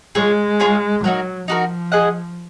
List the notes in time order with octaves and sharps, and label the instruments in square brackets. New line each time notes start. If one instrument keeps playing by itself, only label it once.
[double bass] G#3 [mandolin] F4 G#4 C#5
[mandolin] F4 G#4 C#5
[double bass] F#3 [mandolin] D#4 F#4 A#4
[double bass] F3 [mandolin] D#4 F#4 A#4
[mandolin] G#4 D#5 F#5